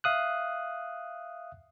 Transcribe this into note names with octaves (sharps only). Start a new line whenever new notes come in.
E5 F5 D#6 F#6